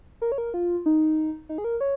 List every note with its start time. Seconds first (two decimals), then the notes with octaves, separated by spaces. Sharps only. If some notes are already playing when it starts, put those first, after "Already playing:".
0.22 A#4
0.32 C#5
0.38 A#4
0.54 F4
0.86 D#4
1.49 D#4
1.58 G#4
1.64 A#4
1.81 C#5